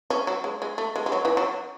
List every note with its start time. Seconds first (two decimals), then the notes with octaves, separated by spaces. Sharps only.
0.10 C#4
0.27 F#3
0.44 G#3
0.62 G#3
0.78 A3
0.96 G#3
1.06 G#3
1.12 F#3
1.25 E3
1.37 F#3